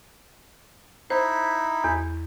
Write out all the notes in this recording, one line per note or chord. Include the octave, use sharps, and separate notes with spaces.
D#4 E4 C5
E2